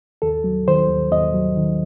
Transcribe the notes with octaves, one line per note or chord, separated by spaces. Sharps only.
D#2 A4
F#3
D#3 C5
D#2
D#2 D#5
F#3
D#3